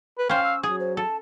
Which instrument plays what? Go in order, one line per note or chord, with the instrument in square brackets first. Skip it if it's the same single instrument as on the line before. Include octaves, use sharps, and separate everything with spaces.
[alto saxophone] B4
[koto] C#4 C5 [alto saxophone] F5 [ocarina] G5
[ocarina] E6
[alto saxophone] F#3 [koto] G#4 [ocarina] D#6
[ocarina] C5
[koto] A4 [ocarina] A5